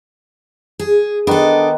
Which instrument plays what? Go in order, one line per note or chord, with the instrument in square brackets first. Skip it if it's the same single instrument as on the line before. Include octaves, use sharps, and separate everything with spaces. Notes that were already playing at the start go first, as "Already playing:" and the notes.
[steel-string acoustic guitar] G#4
[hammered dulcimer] D#3 B3 [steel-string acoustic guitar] D4 A4